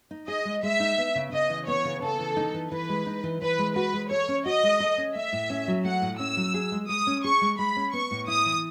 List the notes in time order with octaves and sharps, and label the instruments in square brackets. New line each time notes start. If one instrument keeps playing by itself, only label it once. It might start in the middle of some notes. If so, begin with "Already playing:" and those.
[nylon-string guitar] D#4
[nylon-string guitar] G#4 [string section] D#5
[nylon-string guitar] G#3
[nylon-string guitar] G#3 [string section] E5
[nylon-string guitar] D#4
B3
C#3
[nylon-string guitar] C#3 [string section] D#5
[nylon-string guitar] E3
[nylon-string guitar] B3 [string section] C#5
[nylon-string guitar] C#3
[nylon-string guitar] C#3 [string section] A4
[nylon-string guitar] E3
D#4
E3
[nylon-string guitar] E3 [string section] B4
[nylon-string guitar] G#3
D#4
E3
[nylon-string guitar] E3 [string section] B4
[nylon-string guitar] G#3
[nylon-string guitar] F#4 [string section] B4
[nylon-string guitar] G#3
[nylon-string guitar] A4 [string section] C#5
[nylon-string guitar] C#4
[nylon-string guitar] F#4 [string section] D#5
[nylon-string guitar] G#3
A4
C#4
[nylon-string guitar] A3 [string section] E5
[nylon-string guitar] A2
C#4
F#3
[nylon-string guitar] A3 [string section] F#5
[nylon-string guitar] A2
[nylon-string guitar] C#4 [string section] E6
[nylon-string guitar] F#3
G#4
G#3
[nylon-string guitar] G#3 [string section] D#6
[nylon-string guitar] C#4
[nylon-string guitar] G#4 [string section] C#6
[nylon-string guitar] G#3
[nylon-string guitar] G#3 [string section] B5
[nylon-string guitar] C#4
[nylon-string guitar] B3 [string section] C#6
[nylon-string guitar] A2
[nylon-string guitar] E4 [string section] D#6
[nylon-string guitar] E3